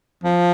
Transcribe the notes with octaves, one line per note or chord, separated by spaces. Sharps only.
F3